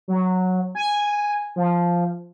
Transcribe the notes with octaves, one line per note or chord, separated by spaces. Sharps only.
F#3
G#5
F3